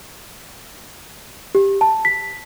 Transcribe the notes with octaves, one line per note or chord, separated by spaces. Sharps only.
G4
A5
B6